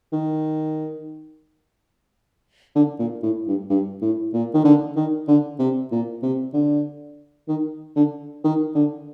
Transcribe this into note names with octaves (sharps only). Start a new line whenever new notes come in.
D#3
D3
A#2
A2
G2
G2
A2
A#2
D#3
D3
D#3
D3
C3
A#2
C3
D3
D#3
D3
D#3
D3